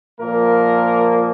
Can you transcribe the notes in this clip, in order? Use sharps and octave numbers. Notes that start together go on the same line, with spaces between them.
A#2 F3 A#3 A#4